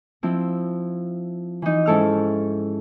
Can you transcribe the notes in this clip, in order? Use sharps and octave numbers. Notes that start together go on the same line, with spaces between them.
F3 C4 E4
E3 D#4
G#2 C#4 E4 A4 E6 F6